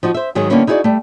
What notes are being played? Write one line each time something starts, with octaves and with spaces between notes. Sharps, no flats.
F3 D#4 F#4
C5 E5
G#2 D#3 F#3 G#3 G#4
D3 G3 A#3 B3 C#4 E4
D#4 E4 F#4 G#4 C#5 D5
G3 A3